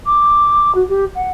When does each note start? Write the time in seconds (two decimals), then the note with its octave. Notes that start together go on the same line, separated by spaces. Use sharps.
0.05 D6
0.74 F#4
0.88 G4
1.14 F#5